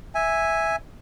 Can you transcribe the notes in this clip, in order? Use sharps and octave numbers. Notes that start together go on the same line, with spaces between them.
E5 G#5